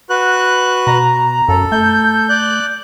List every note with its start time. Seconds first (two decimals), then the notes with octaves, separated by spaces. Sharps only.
0.10 F#4 B4 F#6
0.87 B2 A#5
1.48 F#2 A4
1.72 A3 G6
2.29 D5 F#6